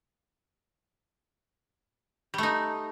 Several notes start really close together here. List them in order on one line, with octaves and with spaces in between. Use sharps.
G3 A3 D#4